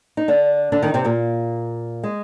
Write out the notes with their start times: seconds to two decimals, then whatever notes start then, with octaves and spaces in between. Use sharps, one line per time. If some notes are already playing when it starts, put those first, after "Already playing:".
0.17 D#4
0.28 D3 D4
0.72 D3 D4
0.83 D#3 D#4
0.94 C3 C4
1.05 A#2 A#3
2.04 G#3